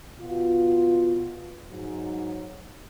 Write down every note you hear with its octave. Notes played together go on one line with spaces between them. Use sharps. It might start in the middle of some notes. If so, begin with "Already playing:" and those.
B2 F4
G#2 F#3